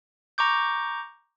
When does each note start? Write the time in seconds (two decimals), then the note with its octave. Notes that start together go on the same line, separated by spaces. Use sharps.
0.38 A#5 C#6 D6 G6